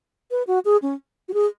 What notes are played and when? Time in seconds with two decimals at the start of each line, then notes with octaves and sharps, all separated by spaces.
0.31 B4
0.47 F#4
0.65 G#4
0.82 C#4
1.28 F#4
1.34 G#4